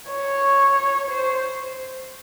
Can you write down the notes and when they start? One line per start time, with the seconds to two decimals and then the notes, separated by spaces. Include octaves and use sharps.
0.11 C#5
1.11 C5